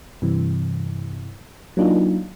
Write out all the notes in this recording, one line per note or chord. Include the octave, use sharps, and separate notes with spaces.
G2 C3 E3
F#3 A#3 D4 D#4 F4